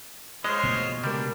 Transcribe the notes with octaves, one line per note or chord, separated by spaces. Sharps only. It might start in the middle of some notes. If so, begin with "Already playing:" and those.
G#3 F4 C5 C#5 D#5
B2 A3 A#3
C#2 G3 D4 A#4